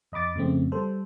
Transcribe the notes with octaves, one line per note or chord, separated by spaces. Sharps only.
F2 D#5 B5 D6 A6
F2 C#3 A3 C4
G3 A4 C5